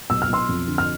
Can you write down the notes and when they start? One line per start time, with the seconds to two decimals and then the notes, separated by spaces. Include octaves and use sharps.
0.10 B1 E6
0.22 F6
0.29 B1 C6 E6
0.49 F2
0.68 D3
0.78 F6